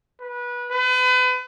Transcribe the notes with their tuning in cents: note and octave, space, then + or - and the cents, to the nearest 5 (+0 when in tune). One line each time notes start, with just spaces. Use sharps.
B4 -25
B4 +35